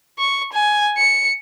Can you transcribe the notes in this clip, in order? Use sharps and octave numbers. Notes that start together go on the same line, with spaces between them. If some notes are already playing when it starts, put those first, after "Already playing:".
C#6
G#5
C#7